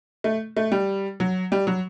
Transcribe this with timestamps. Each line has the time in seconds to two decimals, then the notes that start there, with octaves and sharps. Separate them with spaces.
0.24 A3
0.57 A3
0.72 G3
1.20 F#3
1.52 G3
1.67 F#3